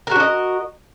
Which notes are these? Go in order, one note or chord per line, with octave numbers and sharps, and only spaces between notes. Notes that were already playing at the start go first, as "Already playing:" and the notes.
D4 F#4 A#4 D#5